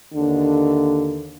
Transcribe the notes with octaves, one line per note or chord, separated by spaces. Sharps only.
D#2 D3